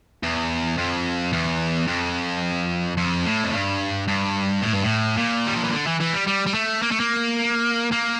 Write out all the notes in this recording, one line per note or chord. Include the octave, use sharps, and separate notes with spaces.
E2
F2
E2
F2
F2
A2
F2
G2
G2
A2
G2
A2
A#2
G3
F3
E3
D3
E3
E3
G3
G3
G3
A3
A#3
A3
A#3
A#3